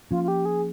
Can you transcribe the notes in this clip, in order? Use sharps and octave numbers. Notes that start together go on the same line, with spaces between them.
F3 A#3 C#4 F4
F4
G4
G#4